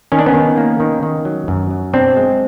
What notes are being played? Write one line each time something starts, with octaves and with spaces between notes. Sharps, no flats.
D#3 C#4
D4
B3 C#4
D#3
A#3
D#3
D#3
F#3
F#2
F#3
B2 C4 D4
G#3